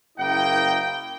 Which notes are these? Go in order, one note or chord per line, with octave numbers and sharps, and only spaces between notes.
F#1 A#3 E4 D#5 G5